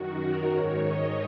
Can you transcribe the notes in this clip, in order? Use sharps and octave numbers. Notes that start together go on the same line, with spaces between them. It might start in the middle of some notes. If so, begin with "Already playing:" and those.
Already playing: F#2 D#3 F#4
A#4
G#2 D#3 C#5
D#5